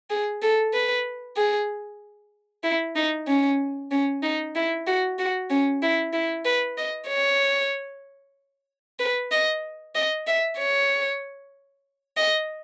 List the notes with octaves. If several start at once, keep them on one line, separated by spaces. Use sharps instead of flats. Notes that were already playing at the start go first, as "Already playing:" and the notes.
G#4
A4
B4
G#4
E4
D#4
C#4
C#4
D#4
E4
F#4
F#4
C#4
E4
E4
B4
D#5
C#5
B4
D#5
D#5
E5
C#5
D#5